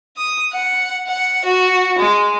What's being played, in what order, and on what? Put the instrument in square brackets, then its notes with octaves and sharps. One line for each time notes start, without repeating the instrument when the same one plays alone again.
[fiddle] D#6
F#5
F#5
F#4
G#3